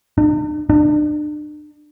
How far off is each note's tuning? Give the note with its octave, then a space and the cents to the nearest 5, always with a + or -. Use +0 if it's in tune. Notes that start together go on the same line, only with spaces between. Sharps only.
D4 +45
D4 +35